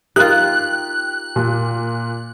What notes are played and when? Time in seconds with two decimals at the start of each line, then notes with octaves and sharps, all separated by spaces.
0.16 D#4 F4 G4 A#4 F#6
1.36 A#2